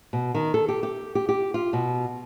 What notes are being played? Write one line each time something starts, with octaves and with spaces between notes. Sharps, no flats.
B2
D#3
A4
G4
G4
G4
G4
F4
B2